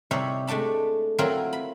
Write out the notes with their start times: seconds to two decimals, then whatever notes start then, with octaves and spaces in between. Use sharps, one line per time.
0.11 C3 G3 D#4 E4 C#5
0.47 G#3 A3 D4 A5 B5
1.18 F#3 C4 E4 F4 A#4
1.53 B5